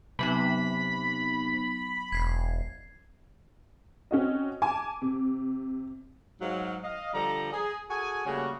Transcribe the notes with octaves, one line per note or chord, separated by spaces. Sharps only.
C3 F#3 B3 D#4 B5
E1 G#6 C7
C4 C#4 F#4 D#5
G#5 A5 D6
C3
G#2 F#3 F5
D#5 F5
D3 F3 G3 A4 A#5
G#4
F#4 G#4 A4 G#5
C#3 G3 A3 A#3 F#4